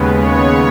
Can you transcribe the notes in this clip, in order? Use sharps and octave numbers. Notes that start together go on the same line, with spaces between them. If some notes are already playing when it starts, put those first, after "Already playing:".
Already playing: D#2 C#3 G#3 B3
C#5